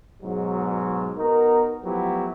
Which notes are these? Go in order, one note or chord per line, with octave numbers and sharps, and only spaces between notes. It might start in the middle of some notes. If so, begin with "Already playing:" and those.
G#2 B2 F#3
B3 D#4 F#4 A#4
F3 F#3 A3 B3 E4 G4